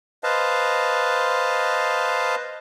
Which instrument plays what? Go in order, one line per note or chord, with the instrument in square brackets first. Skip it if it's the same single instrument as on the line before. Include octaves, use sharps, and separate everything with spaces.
[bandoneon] B4 C5 D#5 F5 A5